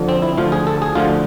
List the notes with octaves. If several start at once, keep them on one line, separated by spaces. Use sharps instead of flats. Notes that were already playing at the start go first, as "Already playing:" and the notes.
Already playing: F2 D3 F3
C4
E4
D2 D3 F3 F4
G#4
A4
G#4
D2 D3 F3 F4